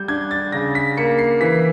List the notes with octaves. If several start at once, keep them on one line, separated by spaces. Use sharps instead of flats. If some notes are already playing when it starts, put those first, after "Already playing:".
Already playing: G3 G6
D4 G#6
A6
C#3 A#6
B6
A#3 C#7
C7
E3 B6